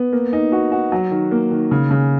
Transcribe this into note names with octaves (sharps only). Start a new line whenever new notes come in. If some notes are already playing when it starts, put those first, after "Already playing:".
Already playing: B3
A#3
D#4
F#4
F#4
F#3
D#3
A#3
D#3
C#3
C#3